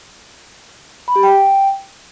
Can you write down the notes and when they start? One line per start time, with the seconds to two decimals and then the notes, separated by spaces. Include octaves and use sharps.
1.08 B5
1.16 G4
1.23 G5